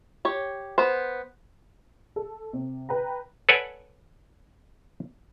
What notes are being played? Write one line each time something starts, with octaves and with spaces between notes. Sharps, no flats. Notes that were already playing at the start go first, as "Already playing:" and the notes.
G4 C#5
B3 C5
A4
C3
B4 G5 A#5
A4 B4 C#5 D5 F#5 G#5